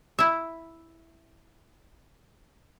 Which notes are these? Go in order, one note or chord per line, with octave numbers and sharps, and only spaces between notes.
E4 E5